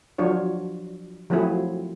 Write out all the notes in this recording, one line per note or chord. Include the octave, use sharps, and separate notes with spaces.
F3 F#3 D4 F4 C#5
F3 F#3 A3 C4 E4 G#4